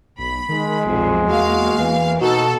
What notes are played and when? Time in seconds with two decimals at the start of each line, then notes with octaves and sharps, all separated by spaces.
0.19 B1 B5
0.49 D#3 G#3
0.85 B1 F2 A#2
1.27 E2 A#3 F#4 F5
1.78 E2 E3
2.21 B2 D#4 F#4 A4